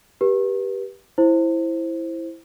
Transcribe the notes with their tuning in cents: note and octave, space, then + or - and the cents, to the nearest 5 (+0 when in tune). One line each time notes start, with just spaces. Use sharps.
G4 +0 B4 -30
E4 +0 C5 +10